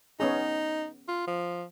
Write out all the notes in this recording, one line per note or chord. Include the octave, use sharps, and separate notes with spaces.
B3 C#4 D#4 G#4
F4
F3